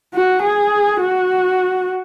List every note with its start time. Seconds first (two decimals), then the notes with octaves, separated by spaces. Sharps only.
0.14 F#4
0.42 G#4
1.00 F#4